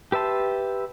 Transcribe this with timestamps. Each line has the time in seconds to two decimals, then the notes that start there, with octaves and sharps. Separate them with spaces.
0.12 G4 B4 E5 A5 C6